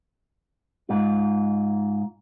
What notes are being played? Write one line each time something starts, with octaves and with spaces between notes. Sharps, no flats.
G#2 F4